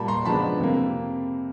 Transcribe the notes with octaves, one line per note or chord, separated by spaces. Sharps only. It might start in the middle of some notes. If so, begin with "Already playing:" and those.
Already playing: A#2 G3 A#3 A5 B5
A#5 C6
C#3 F3 G#3 B3 D4 A5 B5
F2 C3 F3 A#3